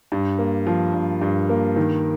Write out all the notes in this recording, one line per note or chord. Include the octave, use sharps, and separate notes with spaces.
G2
A#3
F3
G2
G2
A#3
D#3